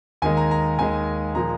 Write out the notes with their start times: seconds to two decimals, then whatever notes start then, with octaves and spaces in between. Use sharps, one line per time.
0.22 D#2 D#3 G#3 G#5
0.37 A#5
0.51 A#5
0.79 D#2 D#3 G#3 G#5
1.34 A#2 F3 G#3 A#5